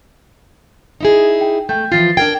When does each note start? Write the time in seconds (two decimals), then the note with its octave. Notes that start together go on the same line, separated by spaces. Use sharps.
1.01 D#4 E4 G#4
1.41 G5
1.69 A3 G5 G6
1.92 E3 F3 F4 A6 C7
2.17 D4 A#4 G5 G#6